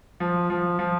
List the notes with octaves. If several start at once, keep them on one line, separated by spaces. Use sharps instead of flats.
F3
F3
F3